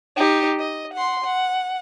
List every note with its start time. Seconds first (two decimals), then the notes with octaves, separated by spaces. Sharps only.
0.16 D#4 G4
0.59 D#5
0.93 F#5 C6
1.24 F#5